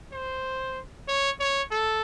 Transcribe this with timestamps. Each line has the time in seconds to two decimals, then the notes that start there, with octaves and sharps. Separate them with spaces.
0.12 C5
1.08 C#5
1.40 C#5
1.71 A4